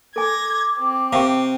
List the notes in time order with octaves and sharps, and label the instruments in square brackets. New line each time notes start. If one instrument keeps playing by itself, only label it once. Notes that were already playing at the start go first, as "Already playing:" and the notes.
[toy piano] A4 G#5 [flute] D6 [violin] G#6 A#6
[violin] C4
[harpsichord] C3 [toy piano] F5 G5 C#6